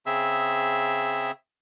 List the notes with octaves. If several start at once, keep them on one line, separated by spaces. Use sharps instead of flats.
C#3 C4 G#4 E5 E6